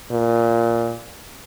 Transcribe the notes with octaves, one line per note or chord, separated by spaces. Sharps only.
A#2